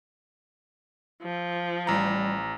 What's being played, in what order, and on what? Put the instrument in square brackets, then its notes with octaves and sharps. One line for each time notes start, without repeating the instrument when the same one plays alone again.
[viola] F3
[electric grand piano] A1 A#5 [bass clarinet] G3